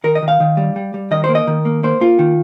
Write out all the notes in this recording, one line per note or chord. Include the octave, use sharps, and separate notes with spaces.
D#3 A#4
D#5
D#3
F5
D#3
G3
G3
G3
D#3 D#5
C5
A#3
D#5
D#3
A#3
A#3 C5
A#3 F4
D#3